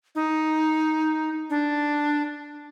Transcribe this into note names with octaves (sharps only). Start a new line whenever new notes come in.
D#4
D4